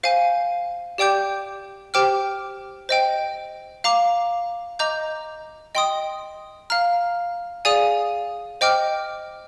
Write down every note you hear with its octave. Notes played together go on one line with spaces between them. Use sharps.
C5 F5 G#5
G4 D5 G5 D6 G6
G4 C5 G5 D6 F6
C5 D#5 G5
F5 A#5 D6
D#5 A#5 D6 G6
D#5 G5 C6 D#6
F5 A#5 F6
G#4 D5 F5 G#5 D#6
C5 D#5 G5 D6 F6